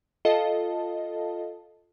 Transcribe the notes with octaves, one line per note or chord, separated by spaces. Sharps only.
F4 A4 D#5 F5 A5